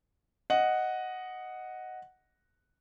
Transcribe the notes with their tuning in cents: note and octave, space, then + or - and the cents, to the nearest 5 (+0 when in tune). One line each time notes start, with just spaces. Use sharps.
D#5 +0 F#5 +0